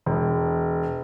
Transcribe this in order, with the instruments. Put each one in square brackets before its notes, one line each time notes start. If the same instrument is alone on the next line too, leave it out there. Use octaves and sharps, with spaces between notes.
[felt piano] E1